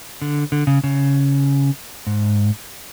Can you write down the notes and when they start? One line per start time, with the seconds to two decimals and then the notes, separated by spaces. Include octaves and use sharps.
0.22 D3
0.52 D3
0.67 C#3
0.84 C#3
2.07 G#2